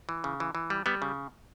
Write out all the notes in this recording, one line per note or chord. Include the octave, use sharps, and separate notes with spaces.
E3
C#3
E3
E3
G3
G3 B3
C#3